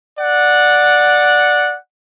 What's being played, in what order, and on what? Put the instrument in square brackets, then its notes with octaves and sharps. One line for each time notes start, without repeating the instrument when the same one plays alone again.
[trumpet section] D5 F#5